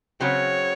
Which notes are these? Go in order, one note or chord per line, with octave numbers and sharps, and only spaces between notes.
C#3 F#3 C4 C#5